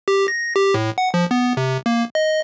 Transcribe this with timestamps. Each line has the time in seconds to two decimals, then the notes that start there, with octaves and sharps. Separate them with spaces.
0.08 G4
0.28 A#6
0.56 G4
0.74 A2
0.98 F#5
1.14 F3
1.31 B3
1.57 C3
1.86 A#3
2.15 D#5